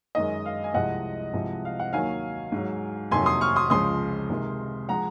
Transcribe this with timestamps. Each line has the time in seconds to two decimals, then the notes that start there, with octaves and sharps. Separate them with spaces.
0.15 F#2 D#3 G#3 D#5
0.46 F5
0.64 G#5
0.74 C2 C3 F3 G#3 D#5 F#5
1.33 C2 C3 F3 G#3
1.65 F5
1.80 F#5
1.93 D#2 D#3 F#3 F5 G#5
2.52 G#2 F#3
3.11 F2 C3 D#3 F#3 G#5 C6
3.26 C6 D#6
3.41 C#6 F6
3.56 C6 D#6
3.70 C#2 C#3 F3 G#3 C6 D#6
4.30 C#2 C3 D#3 G#3
4.89 F3 G#3 F#5 A#5